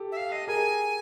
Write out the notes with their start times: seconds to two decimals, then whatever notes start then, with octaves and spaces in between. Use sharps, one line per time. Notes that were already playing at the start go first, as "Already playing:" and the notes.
Already playing: G4 A4
0.12 E5
0.17 F5
0.32 D#5
0.47 G#4 A#4 G#5